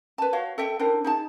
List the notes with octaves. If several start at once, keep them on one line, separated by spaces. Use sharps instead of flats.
B4 A5
F#4 C#5 F5
A4 E5 G5
D4 E4 A#4 C5
D#4 G#4 A5